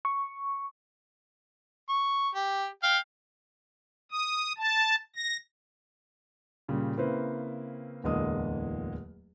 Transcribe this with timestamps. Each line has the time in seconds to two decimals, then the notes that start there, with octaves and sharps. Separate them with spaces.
0.05 C#6
1.89 C#6
2.35 G4
2.83 F5 G5
4.12 D#6
4.58 A5
5.16 A#6
6.68 A#2 C#3 G3
6.97 C#3 A#3 C4 E4 B4 C5
8.04 D1 E2 D3 G#3 A#3 D#6